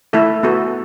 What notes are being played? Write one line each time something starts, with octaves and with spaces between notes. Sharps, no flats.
A3 E4 A4 E5
B3 F#4 A4